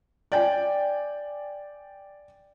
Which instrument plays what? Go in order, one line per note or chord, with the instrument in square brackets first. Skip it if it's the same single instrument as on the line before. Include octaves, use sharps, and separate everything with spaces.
[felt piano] D5 G5 G#5